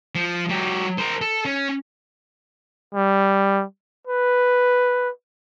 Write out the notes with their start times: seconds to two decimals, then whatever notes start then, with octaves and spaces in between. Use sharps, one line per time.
0.15 F3
0.49 F#3 G4
0.98 A#4 C5
1.21 A4
1.45 C#4
2.95 G3
4.07 B4